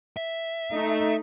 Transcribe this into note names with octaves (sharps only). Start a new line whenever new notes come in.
E5
A3 D#4